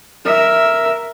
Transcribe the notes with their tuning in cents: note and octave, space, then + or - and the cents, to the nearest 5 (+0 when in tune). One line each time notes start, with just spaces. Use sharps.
A#4 +0 E5 +0